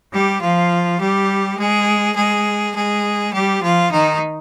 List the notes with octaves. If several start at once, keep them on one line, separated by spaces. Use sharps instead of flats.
G3 G4
F3 F4
G3 G4
G#3 G#4
G#3 G#4
G#3 G#4
G3 G4
F3 F4
D#3 D#4